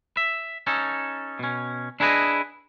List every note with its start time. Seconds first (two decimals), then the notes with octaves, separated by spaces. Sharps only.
0.17 E5
0.67 C#4 D#4 A4
1.39 B2 C#4
2.00 D4 E4 G#4 B4 C#5 D#5